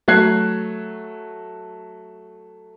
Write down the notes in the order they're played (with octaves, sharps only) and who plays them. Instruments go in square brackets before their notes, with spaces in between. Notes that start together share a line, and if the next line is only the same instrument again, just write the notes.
[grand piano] F#3 A3 F#6 G#6 C7